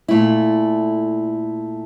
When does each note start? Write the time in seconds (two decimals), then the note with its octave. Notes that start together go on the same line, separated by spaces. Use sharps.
0.08 A#2 A3 E4